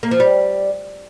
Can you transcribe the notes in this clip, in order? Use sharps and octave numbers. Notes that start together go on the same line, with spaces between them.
A#3
F3
G3